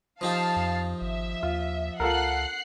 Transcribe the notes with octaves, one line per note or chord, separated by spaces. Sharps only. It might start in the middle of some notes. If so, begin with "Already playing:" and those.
F3 D#4 G4 F5 A5
F2
G#1 E5
D#2 F4
C#2 F4 A4 A#4 F#5 F#6 C7